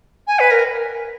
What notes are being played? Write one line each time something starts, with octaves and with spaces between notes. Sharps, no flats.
G#5
B4
A#4